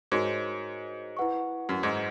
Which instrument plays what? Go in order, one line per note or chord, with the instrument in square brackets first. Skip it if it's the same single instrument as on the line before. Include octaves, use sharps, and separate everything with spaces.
[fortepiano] G#2 [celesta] D#4 F#4 A#4 C#5
[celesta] E4 B4 F#5 C#6
[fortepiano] F#2
G#2